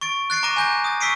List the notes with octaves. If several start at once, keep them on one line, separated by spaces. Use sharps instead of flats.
C#6 A6 D7
F#6 A6 C7 D7
A#5 C#6 D6 A#6 D#7
G#5 G6 A#6
D#6 A6
C#6 E6 B6 C7 D7 D#7